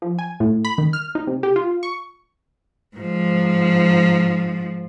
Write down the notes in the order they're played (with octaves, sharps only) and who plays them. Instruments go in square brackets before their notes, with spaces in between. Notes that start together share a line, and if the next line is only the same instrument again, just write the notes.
[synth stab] F3
G#5
A2
B5
D#3
F6
D#4
C3
G4
F4
C#6
[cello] G#2 F3